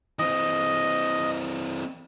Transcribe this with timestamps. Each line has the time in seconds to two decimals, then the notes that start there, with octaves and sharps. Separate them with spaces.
0.19 E3 C4 D#5